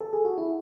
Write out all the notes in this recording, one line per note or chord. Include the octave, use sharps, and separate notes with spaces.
A4
G#4
F#4
E4